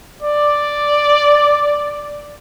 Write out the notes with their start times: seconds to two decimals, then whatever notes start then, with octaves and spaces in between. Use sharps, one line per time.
0.23 D5